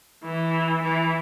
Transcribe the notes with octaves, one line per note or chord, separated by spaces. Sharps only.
E3
E3